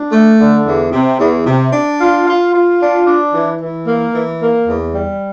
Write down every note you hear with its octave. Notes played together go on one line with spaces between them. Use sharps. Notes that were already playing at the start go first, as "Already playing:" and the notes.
Already playing: D4
A3
D3
E2
C3
E2
C3
D4
F4
F4
F4
D4
D4
E3
E3
A#3
E3
A#3
E2
G3